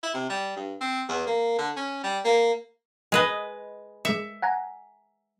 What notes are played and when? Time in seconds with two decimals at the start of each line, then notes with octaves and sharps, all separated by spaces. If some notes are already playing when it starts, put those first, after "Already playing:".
0.03 E4
0.14 C3
0.30 G3
0.56 G2
0.81 C4
1.09 E2
1.27 A#3
1.59 D3
1.76 C#4
2.04 G3
2.25 A#3
3.12 G#3 B4 D#5
4.05 G#3 E5 C#7
4.42 F#5 G#5 A#5